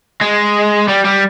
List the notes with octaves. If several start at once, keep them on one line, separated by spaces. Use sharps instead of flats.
G#3
G3
G3